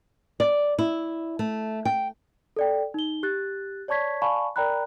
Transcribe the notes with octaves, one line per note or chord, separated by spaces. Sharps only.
D5
E4
A3
G5
A4 D5 G5
D#4 G7
G4 F#6 A6
C#5 D5 A5 C#6 G#6 B6
D5 F5 G#5 A5 B5 C#6
A#4 D5 G5 A#5 B5 F#6